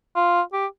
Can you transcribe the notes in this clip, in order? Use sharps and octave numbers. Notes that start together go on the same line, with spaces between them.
F4
G4